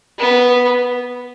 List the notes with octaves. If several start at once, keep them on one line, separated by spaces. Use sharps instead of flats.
B3